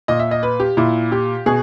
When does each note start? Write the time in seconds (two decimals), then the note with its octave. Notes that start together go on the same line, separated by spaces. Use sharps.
0.08 A#2 D#5
0.19 E5
0.31 D#5
0.43 B4
0.60 G4
0.77 A#2 E4
1.12 G4
1.46 B2 G#4